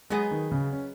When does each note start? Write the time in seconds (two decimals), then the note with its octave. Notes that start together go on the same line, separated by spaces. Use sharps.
0.10 F#3 G#3 B3 G#4 D#5
0.31 D#3
0.52 C#3
0.73 C#4